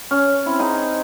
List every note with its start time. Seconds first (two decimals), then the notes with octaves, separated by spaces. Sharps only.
0.11 C#4
0.46 C4 E4
0.59 D#4 G#4 A#5